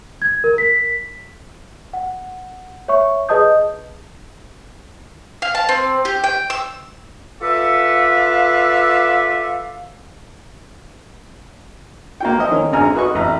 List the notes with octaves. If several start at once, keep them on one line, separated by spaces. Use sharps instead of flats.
G#6
A#4
B6
F#5
C#5 E5 C#6
G#4 B4 D#5 A5 D#6 G6
F5
A5
C4
G4
G5
E6
F4 A4 B4 D5 E5 F5
A#3 F#4 G5
F3 D#5
D#3 C#4 A#4
G#1 D3 G#5 A#5 F6
F#4 B4 D#5 C#6
A1 A#5